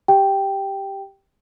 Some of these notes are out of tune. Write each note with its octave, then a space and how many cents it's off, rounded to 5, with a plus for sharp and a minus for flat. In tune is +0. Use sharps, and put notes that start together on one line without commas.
G4 +0 G5 +0